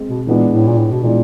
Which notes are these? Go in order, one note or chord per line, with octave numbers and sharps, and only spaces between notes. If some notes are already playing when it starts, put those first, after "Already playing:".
Already playing: G#3 C4
B2
A#2 E3 G#3 B3 D4
A2
A#2
A2
B2
A#2 E3 G#3 B3 D4